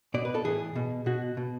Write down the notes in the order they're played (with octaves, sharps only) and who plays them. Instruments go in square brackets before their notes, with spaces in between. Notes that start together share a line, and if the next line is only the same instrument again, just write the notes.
[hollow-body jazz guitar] B2 D5
B4
A4
A2 E3 G#4
B2
B2 F#4
B2